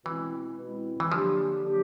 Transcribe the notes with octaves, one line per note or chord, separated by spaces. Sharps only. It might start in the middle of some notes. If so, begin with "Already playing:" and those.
B2 E3 G#3 C4 E4
B2 G#3 C4 E4
E3
D3 F3 F#3 A#3 D4 G4
D3 F#3 A#3 D4 G4